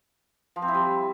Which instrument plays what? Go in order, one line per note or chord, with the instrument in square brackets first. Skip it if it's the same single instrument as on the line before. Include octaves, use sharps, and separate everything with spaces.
[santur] F3
C4
E4
G3